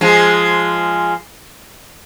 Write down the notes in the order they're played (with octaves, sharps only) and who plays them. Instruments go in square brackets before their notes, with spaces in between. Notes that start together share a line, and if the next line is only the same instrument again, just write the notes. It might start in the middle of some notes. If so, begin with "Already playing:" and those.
[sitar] F3 G#3